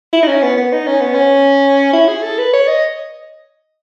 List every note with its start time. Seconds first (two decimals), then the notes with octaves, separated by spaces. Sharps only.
0.13 E4
0.23 D#4
0.28 C#4
0.43 B3
0.57 B3
0.73 D#4
0.87 C#4
1.01 B3
1.14 C#4
1.93 E4
2.08 G#4
2.23 A4
2.38 B4
2.53 C#5
2.68 D#5